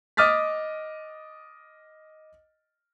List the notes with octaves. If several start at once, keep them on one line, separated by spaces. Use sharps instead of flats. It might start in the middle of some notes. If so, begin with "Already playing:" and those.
D#5 D6 D#6 F6 A6 B6